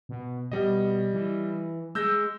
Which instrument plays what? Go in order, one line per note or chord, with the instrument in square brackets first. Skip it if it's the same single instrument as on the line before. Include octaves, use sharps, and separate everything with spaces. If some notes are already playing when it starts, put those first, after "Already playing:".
[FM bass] B2
[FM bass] B2 [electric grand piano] G3 D#5
[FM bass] E3
[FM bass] G#3 [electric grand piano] E6 G6 A#6